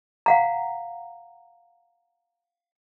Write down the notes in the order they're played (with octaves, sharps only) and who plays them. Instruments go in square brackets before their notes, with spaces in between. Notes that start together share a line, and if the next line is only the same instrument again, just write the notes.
[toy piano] F5 F#5 A#5